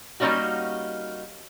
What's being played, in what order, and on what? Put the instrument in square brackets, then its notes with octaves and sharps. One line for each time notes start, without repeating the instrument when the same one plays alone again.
[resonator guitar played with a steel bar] G3 A#3 C4 C#4 D#4 F#4